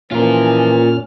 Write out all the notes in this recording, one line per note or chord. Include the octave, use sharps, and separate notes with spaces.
A#2 E3 F3 C#4 F4 A#4 F6